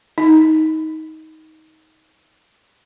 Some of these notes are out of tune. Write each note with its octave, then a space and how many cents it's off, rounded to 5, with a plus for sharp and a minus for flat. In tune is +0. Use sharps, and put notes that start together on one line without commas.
D#4 +20